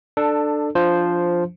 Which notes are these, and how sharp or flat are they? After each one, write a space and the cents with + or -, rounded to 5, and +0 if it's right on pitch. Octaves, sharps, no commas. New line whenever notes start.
D4 +20 A4 +5
F3 +0 D4 +0 C5 +0